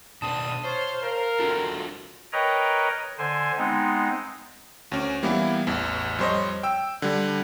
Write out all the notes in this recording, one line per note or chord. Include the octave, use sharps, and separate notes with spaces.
B2 C4 D4 A5 D#6
F4 C5 C#5
A#4 F5
C4 D4 F4 F#4 A4
A#4 B4 C#5 D#5 G5 A#5
D3 C5 G#5
G#3 B3 C4 D#4
D2 C#4
E3 G3 A#3 B3 E4
A1 E2
F2 G3 C5 C#5 D#5
G5 E6
D3 G3